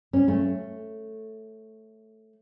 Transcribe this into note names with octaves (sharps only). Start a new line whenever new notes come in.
C#4
A3